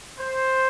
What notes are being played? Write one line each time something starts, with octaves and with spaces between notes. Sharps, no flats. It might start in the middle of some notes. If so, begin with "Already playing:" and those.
C5